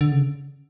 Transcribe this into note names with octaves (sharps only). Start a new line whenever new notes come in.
D3
C#3